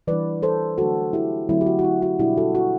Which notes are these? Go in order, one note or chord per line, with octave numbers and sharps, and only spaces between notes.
E3 G3 D4 B4 D5
A4 C5
D3 F#3 A3 D4 F#4 A4
E4 G4
D3 F#3 A3 C4 E4
G4
F#4
F#4
E4
F#4
B2 G3 D4 E4 G4
F#4 A4
F#4